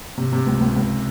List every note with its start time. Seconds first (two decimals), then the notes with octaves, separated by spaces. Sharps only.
0.17 C3
0.32 C3
0.46 C#2
0.60 C#2
0.76 C#2